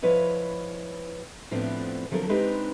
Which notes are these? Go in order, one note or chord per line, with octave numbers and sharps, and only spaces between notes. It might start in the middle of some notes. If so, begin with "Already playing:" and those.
F3 E4 B4 C#5 D#5
A2 F3 B3 C4 D4
D3 F3 F#3 C4 A4 A#4
G#3 C4 D4 D#4 G4 B4